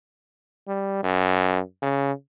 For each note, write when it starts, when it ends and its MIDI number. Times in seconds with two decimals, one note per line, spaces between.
0.68 1.00 55
1.03 1.60 42
1.82 2.12 49